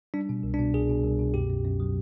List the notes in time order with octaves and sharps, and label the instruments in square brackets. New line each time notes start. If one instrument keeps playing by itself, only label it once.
[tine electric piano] G3 D4
B2
C2
D4
B2
C2 G#4
B2
C2
B2
F#2 G4
F#2
F#2
F#3